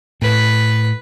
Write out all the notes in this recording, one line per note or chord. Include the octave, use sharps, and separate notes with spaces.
A2 B4